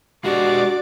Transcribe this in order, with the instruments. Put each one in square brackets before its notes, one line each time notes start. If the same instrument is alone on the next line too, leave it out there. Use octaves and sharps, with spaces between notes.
[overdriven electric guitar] G#3 D4 [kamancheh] F#4 [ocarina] G4 [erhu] D5